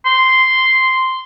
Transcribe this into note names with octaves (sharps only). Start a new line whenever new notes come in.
C6